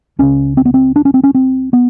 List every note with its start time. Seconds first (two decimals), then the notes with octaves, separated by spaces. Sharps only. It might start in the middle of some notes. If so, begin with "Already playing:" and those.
0.19 C#2 C#3 C#4
0.57 C4
0.65 B3
0.74 C4
0.96 D4
1.05 C#4
1.14 C4
1.24 C#4
1.34 C4
1.73 B3